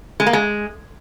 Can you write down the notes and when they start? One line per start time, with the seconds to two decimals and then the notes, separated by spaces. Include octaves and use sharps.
0.20 G#3
0.27 A#3
0.33 G#3